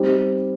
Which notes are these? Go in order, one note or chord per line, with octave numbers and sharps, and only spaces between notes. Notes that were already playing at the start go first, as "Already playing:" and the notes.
Already playing: G3 C4 D#4